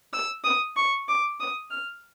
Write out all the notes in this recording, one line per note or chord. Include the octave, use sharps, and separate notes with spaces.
E6
D#6
C#6
D6
D#6
F6